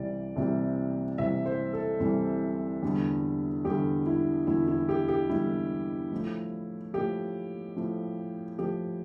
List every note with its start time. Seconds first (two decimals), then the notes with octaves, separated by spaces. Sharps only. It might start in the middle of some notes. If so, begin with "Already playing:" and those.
Already playing: C2 C3 E3 G3 D5
0.36 C2 C3 E3 G3
1.18 C2 C3 E3 G3 E5
1.46 C5
1.73 A4
2.00 C2 C3 E3 G3
2.83 E2 D3 G3
3.65 E2 D3 G3 G4
4.06 E4
4.47 E2 D3 G3 E4
4.68 E4
4.89 G4
5.09 G4
5.29 E2 D3 G3 E4
6.12 A2 F3
6.94 A2 F3 G4
7.76 A2 F3
8.58 A2 F3 G4